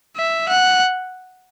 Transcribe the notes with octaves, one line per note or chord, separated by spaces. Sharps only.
E5
F#5